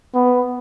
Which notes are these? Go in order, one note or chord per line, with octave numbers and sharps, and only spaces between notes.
B3